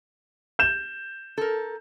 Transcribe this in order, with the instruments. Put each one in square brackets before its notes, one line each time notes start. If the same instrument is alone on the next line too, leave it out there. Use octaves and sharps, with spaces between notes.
[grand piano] G6 E7
[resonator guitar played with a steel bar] A4 A#4